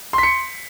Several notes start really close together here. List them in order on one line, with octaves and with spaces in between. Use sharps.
C6 B6 C#7